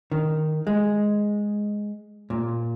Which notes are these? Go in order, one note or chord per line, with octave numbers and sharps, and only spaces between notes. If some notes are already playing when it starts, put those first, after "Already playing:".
D#3
G#3
A#2